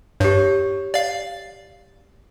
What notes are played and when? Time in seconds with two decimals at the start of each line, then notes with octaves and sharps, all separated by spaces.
0.20 G2 G4 C#5
0.94 D5 F5